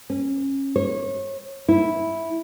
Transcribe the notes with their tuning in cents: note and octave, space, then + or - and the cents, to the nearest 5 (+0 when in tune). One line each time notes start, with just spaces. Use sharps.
C#4 -20
C#5 -30
E4 -5